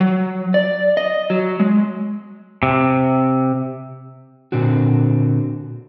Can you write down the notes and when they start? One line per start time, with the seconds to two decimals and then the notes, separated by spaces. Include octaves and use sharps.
0.01 F#3
0.54 D5
0.97 D#5
1.30 F#3
1.60 G#3
2.63 C3
4.52 A#2 D3 C4 F#4